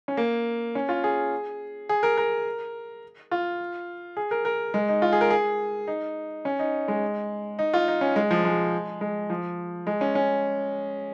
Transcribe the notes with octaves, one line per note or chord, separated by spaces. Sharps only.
C#4
A#3
C#4
F4
G#4
G#4
A#4
A#4
F4
G#4
A#4
A#4
G#3
D#4
F4
G#4
A#4
G#4
D#4
C#4
D#4
G#3
D#4
F4
D#4
C#4
G#3
F3
G#3
G#3
F3
G#3
C#4
C#4